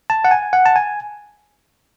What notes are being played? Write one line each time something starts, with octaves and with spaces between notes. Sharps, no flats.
A5
F#5
G#5
F#5
A5
G#5